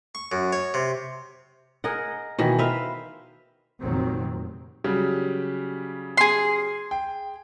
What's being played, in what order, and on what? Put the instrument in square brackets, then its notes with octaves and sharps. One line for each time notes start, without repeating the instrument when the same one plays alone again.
[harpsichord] C#6
F#2
C#5
C3
[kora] G#4 A#4 D#5 F#5
B2 D#3 E3
B4 C5 E5 F5
[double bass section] F1 A#2 D#3 F#3 C4
[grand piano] C#3 F#3 G3
[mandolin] G#4 C6
[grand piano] G5